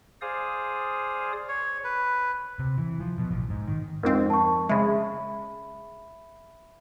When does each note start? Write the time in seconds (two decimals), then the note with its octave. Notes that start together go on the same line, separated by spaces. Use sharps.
0.22 G#4 C5 D5 F5 D#6
1.48 C#5
1.84 B4
2.59 C3
2.78 E3
3.00 F3
3.18 B2
3.31 A1
3.49 G#2
3.68 D#3
4.03 F2 G#2 C4 A#4
4.30 A5 C#6
4.69 C#3 G#3 E5 B5